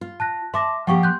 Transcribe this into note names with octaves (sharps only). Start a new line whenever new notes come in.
F4
A5 F#6 A#6
E5 A5 C6 D6 A#6
F3 A#3 G4 F#5 G5 C#6
C6 F#6 G6